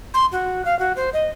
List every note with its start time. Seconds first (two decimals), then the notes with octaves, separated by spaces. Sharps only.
0.14 C6
0.32 F#4
0.65 F5
0.79 F#4
0.96 C5
1.13 D#5